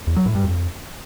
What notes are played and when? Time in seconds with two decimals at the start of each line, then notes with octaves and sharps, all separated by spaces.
0.07 E2
0.16 F#3
0.26 A2
0.35 G2
0.44 F2